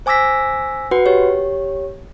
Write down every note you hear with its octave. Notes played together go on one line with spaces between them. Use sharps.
C5 G#5 D6 E6 A#6 B6
F#4 B4 F#5
G4 C#5